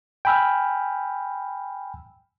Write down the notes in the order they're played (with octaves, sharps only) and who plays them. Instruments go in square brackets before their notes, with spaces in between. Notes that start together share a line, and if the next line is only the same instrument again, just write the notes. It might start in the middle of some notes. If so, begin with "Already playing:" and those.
[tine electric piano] G5 G#5 B5 E6 F6